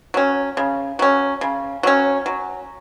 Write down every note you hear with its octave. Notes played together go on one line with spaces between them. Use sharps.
F#3 C#4
C#3
F#3 C#4
C#3
F#3 C#4
F#3